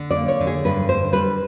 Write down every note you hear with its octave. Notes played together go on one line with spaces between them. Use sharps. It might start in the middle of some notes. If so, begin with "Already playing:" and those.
Already playing: D3
D5
A#3
C#5
D3
G#4
G2 B4
D3 C5
G3 B4